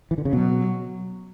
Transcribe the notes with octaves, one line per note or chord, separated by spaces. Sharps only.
E3
D3
C#3
B2 F#3